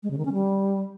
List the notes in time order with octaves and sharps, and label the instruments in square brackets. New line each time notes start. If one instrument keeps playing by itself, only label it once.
[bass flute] G#3
C#3
D#3
C#4
G3